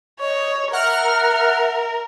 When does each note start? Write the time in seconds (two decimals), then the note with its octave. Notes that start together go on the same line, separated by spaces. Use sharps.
0.20 C#5 D#5
0.73 A#4 E5 F#5 F6